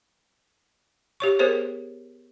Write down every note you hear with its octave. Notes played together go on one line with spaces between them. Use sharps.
G4 C#5 C#6
B3 G#4 A#4 C5 C#5